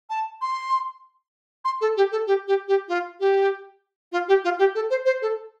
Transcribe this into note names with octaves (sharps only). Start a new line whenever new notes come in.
A5
C6
C6
A4
G4
A4
G4
G4
G4
F4
G4
F4
G4
F4
G4
A4
C5
C5
A4